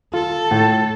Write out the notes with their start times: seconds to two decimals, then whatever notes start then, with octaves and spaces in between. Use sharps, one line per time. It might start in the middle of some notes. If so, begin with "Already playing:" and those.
0.14 F4 A4
0.51 A2